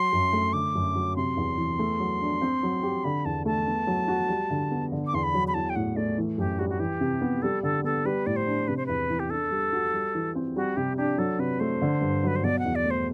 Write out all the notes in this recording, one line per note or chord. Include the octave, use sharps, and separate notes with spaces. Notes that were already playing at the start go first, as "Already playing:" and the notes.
Already playing: F#3 C6
F#2
A3
D3 D6
F#2
F#3
C3 C6
E2
E3
A3
F#3
D4
C4
F#3
G4
D3 B5
E2 A5
A3 A5
B3
F#3
F#4
G3
D3
B3
D3
D6
E2 C6
B5
F#3
B5
E3 A5
G5
A2 F#5
A3 D5
E3
F#2 G4
G3 F#4
F#4
E3 G4
C3
B3
G3 A4
D3 A4
B3 A4
G3 B4
A2 D5
C5
D4
C3 B4
C5
E2 B4
E3
G4
D4 A4
G3
F#4
G3
E3
C4
G3 F#4
C3 G4
D4 G4
F#3 A4
C3 B4
A3 C5
D3
G2
F#3 B4
C5
B2 D5
F#5
E2
D5
A3
C5